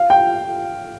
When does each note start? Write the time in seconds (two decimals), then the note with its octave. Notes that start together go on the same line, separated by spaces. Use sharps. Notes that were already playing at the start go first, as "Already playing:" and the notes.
Already playing: F5
0.10 G5